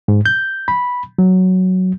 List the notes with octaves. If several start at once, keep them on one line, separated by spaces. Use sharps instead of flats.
G#2
G6
B5
F#3